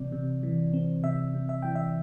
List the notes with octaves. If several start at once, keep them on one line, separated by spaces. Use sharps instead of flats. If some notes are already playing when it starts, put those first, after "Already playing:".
Already playing: C3 E3 C4 D5
C3
E3
C4
C3 E5
C3
E5
E3 G5
E5